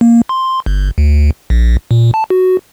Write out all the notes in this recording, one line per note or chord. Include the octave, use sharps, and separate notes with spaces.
A#3
C6
G1
D2
A#1
A#2
A5
F#4